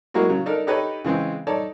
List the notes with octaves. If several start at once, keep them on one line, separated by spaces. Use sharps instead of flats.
F#3 G#3 A#3 E4 F#4
C#3 F#3
D4 D#4 A4 A#4
D#4 G4 A4 B4 C#5 D#5
C#3 E3 G#3 C4
D#4 A4 C#5 D5 A5